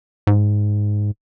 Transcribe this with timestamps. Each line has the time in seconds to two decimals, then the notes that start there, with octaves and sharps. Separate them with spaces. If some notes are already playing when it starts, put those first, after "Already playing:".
0.27 G#2